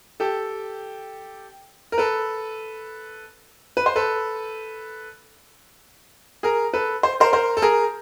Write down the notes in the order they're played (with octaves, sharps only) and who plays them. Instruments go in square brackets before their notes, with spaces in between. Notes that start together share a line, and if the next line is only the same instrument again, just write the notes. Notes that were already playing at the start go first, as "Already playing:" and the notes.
[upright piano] G4 A4
A#4
A4 B4
B4
C5
A4 B4
G#4 A#4
A4 B4
C5
A#4 C5
A#4 C5
A4
G#4 A#4